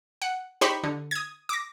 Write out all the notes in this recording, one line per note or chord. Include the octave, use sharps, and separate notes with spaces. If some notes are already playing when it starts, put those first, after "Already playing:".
F#5
D#4 G4 C5 B5 C#6
D3
D#6 G#6
D6 A#6